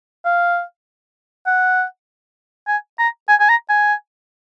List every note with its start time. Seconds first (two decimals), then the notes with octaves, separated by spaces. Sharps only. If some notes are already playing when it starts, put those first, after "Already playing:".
0.25 F5
1.47 F#5
2.68 G#5
2.99 A#5
3.29 G#5
3.40 G#5
3.49 A#5
3.70 G#5